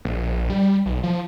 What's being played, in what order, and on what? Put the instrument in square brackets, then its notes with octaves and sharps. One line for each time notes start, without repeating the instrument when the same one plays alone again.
[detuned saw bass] A#1
G3
B1
F3